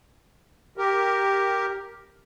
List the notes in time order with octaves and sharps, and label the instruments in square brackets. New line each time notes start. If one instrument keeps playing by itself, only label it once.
[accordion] G4 A#4